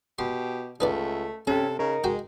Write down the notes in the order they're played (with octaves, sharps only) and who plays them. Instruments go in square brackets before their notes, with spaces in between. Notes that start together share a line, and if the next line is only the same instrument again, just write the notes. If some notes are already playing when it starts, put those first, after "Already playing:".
[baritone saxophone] B2 [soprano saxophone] G4 [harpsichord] C6
[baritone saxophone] C#2 [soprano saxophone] A3 [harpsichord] D#4 B4 D5
[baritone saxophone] C3 [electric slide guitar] C#4 G4 [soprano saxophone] A4 [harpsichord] A#5
[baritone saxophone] C#3 [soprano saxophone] D#4 [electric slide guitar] A#4
[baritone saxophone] G#3 [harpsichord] F#4 G5